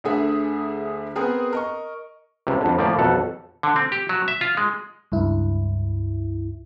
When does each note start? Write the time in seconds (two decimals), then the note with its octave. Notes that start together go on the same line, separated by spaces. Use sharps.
0.04 D2 D3 A3 G#4 E5
1.16 B3 C4 G#4 A#4
1.53 A#4 D#5 C#6
2.47 C#2 C3
2.60 F2 D3
2.78 A2 F3 A#3 D5
2.98 B1 F2 A4 F#5
3.63 D3
3.76 C4
3.92 G4
4.09 F#3
4.28 E5
4.41 F4
4.57 G#3
5.12 C#2 G2 E4